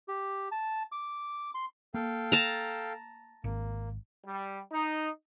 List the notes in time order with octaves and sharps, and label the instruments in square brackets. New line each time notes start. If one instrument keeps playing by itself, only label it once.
[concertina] G4
A5
D6
C6
[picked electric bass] A#3 [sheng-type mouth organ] A4 F5 G5
[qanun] A5 A#5
[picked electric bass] G#1 [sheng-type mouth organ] A#3
[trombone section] G3
D#4